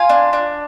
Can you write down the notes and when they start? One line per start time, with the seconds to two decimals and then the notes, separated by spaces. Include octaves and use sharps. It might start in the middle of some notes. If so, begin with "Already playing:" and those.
Already playing: F4 F5 G#5
0.09 D4
0.33 D4